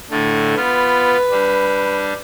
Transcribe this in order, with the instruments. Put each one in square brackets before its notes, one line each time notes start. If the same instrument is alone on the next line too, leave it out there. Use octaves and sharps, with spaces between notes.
[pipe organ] A2 D3 A3
[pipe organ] B3 F4 [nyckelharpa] B4 B5
[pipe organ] G3 D4